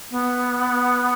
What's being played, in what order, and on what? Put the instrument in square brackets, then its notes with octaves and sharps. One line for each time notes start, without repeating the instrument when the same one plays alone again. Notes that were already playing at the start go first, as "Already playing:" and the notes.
[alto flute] B3